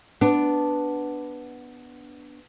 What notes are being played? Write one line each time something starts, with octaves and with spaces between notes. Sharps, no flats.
B3 D4